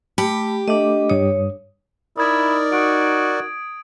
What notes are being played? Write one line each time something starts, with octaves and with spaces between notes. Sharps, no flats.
A3 G4 B5
A3 D4 D#5
G2 C#5 D#6
D#4 E4 A#4 D5 D#6 G#6
F#4 D#6 D7